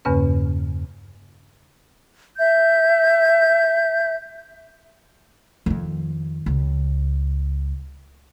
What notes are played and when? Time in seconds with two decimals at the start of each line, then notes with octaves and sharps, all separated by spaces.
0.05 E2 G2 C#3 A#3 C#4 B4
2.38 E5 G6
5.66 F2 D#3
6.46 C#2